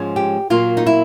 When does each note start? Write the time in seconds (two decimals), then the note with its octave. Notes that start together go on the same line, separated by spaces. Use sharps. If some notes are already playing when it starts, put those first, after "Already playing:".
Already playing: G#2 F3 G#3 C#4
0.16 G4
0.50 A#2 F#3 A#3 F4
0.77 D#4
0.86 E4